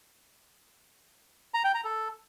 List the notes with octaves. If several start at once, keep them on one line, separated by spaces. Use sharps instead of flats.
A#5
G5
A#5
A4